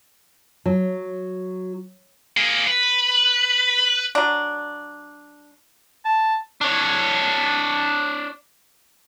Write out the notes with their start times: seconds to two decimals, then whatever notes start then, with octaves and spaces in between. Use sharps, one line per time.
0.66 F#3
2.37 A#3 G#4
2.67 B4
4.15 F#3 D4
6.05 A5
6.61 D4 C#5